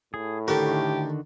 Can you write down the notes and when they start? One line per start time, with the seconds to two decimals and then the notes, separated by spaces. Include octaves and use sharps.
0.14 A2 G#4
0.48 D3 D#3 A3 F#4 G4 A#4